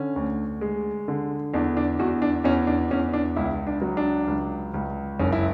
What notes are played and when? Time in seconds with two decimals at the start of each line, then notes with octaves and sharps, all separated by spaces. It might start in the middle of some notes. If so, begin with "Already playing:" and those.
Already playing: D3 C#4
0.16 D2
0.61 G#3
1.08 D3
1.54 E2 D4
1.77 D4
1.99 E2 F#4
2.22 D4
2.44 E2 C#4
2.67 D4
2.91 E2 C#4
3.13 D4
3.36 C#2 E4
3.67 D4
3.82 F#3
3.97 D4
4.28 C#2
4.74 C#2
5.20 F#1 C#4
5.32 E4